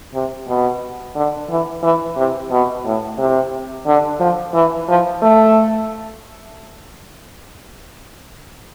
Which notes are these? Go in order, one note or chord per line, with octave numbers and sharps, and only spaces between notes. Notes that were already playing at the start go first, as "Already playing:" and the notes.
C3
B2
D3
E3
E3
C3
B2
A2
C3
D3
F3
E3
F3
A3